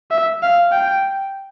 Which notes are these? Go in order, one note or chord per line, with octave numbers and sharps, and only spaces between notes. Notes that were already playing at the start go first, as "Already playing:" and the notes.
E5
F5
G5